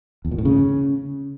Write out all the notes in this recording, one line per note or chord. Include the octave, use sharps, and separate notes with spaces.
E2
A#2
A2
C#3